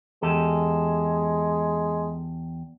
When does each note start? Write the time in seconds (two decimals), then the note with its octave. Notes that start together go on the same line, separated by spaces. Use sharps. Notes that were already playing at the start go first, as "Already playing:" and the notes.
0.22 E2 G#3 G4 A4